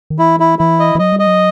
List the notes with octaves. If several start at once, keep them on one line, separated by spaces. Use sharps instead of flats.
D#3
E3 E4
E4
E3 E4
D#5
E3
F#3 D#5
G3
D#5
F#3